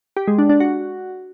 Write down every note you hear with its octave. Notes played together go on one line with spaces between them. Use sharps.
G4
G#3
D4
D4
F#4